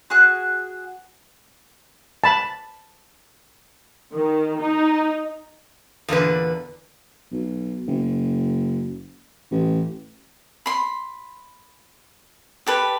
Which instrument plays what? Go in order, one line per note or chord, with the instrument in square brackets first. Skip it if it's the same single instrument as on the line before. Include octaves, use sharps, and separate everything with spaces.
[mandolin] F#4 G#4 F#6
[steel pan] A5 B5
[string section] D#3
D#4
[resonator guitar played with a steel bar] E2 A#2 D3 B4
[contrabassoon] B1
F#1
A1
[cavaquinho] B5 C6
G4 A4 B4